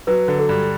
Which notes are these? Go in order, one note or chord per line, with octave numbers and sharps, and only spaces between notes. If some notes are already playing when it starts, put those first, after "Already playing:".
F#3 B4
D3
A4
G2